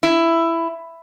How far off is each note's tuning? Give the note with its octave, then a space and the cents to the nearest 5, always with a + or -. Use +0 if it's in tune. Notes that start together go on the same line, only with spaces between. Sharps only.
E4 +10